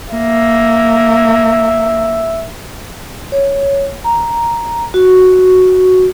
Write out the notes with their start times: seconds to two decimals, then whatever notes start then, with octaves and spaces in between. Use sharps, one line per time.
0.11 A#3 E5
3.32 C#5
4.04 A#5
4.94 F#4